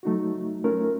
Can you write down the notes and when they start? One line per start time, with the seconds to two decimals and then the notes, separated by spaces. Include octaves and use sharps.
0.03 F#3 A3 D#4 F#4
0.64 A3 C#4 F4 A#4